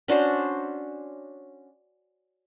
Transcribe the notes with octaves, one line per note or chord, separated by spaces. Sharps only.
C#4 D4 F#4 C5